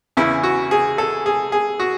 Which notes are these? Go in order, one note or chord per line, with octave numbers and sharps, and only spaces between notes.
E2 C#3 E3 E4
F#4
G#4
A4
G#4
G#4
F#4